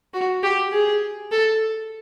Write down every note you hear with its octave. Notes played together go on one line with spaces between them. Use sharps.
F#4
G4
G#4
A4